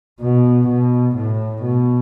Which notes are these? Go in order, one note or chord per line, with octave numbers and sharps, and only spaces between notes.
B2
B2
A2
B2